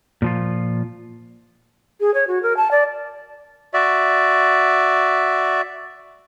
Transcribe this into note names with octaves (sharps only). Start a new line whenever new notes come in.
A#2 F3 F4
G#4
C#5
F#4
A#4
A5
D5
F#4 D5 E5